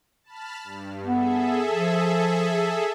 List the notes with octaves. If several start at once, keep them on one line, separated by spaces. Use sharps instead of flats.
A5 B5 F6
G2
B3 G#4 A4 E5
F3